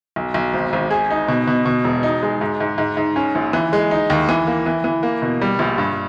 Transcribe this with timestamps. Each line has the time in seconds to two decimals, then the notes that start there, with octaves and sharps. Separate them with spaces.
0.16 B1
0.34 B1
0.54 G#1
0.73 G#1
0.91 G#4
1.11 D#4
1.28 B2
1.47 B2
1.66 B2
1.84 E1
2.03 D#4
2.23 G#3
2.41 G#2
2.60 G#2
2.78 G#2
2.97 G#2
3.16 C#4
3.35 A#1
3.53 E3
3.73 G#3
3.91 D#4
4.10 D#2
4.29 E3
4.47 A#3
4.66 E3
4.84 E3
5.03 A#3
5.22 B2
5.41 G3
5.59 A#1
5.78 G2